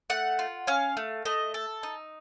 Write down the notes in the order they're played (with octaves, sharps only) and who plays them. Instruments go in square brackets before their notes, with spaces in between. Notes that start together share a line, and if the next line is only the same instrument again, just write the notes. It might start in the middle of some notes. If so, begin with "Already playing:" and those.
[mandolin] A3 F#5
F4
C#4 F5
A3
A3 D#5
A4
D#4